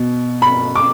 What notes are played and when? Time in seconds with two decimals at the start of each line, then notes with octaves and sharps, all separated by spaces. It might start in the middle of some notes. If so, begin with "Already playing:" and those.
Already playing: B2
0.42 B5
0.75 D6